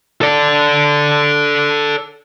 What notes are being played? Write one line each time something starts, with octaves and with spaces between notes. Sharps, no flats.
A4 D5